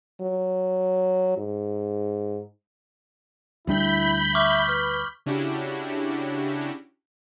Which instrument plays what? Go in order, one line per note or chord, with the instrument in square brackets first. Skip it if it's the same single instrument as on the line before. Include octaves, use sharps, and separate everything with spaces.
[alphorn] F#3
G#2
[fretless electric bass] D2 G3 D4 [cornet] E4 [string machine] B5 G6
[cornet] E5 [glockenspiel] C#6 D6 F6
[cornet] B4 [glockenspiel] F6
[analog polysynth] C#3 C#4 D4 E4 F#4 G4